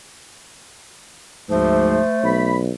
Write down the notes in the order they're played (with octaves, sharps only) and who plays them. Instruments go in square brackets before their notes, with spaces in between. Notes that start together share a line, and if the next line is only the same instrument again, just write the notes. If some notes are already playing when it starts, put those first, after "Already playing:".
[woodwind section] D2 F3 [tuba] G#2 [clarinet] A3 [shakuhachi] C5
[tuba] B1 [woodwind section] B5